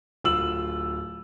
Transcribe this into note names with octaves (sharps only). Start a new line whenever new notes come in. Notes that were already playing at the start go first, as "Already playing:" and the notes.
D1 F4 E6 F#7